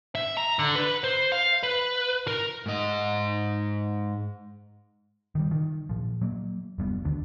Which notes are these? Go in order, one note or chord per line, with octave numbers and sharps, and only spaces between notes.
E5
A#5
D3
B4
C5
F5
B4
A#4
G#2 D#5
D#3 E3 G3
D#3
A#2 F3
F#3 A#3
F1 G3 B3
D#2 D3